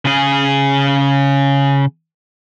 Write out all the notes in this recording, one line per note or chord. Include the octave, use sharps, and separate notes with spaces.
C#3 G#4